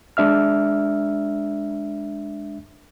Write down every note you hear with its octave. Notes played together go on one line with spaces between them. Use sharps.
G#3 D4 E5 F6